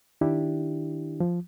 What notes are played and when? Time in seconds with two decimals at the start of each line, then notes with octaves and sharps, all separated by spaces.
0.21 D#3 D4 E4 G4
1.20 F3